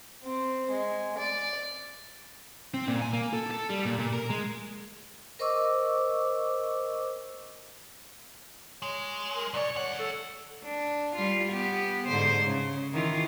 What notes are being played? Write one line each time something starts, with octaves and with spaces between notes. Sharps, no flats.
C4
G#3
D5
C4
A#2
G#5
A#3
A4
A4
G3
A#2
A#2
A#4
G#3
A#4 C5 D#5 C#6 D6 E6
G#3 C#5
A#4
C2 C#5 D5
D2 C#5 F#5
A4
D4
G3 F4
B3 G4
G#2 D3 C5
C#3
D#3 E3 F4